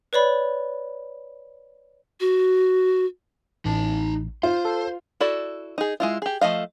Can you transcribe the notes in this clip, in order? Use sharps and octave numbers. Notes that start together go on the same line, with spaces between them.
B4 C#5 D5 B5
F#4
A1 D#4 A5
F4 C5
A4
E4 F#4 A4 D5
D#4 G#4
G#3 E4 F4
G4 G#4
F3 A3 D#5 F5